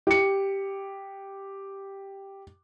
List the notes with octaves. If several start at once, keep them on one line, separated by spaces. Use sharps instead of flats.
G4 C#7